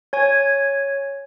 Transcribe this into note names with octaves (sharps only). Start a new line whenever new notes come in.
C#5 G#5 G#6